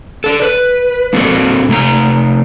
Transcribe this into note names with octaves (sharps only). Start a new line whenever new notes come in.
A4 D5
B4
A#3 C4 D4 F#4 A4 D5
C3 A3 A5 A#5